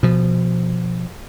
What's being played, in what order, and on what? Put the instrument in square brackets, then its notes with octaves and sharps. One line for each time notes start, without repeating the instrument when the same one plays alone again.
[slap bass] B2 F3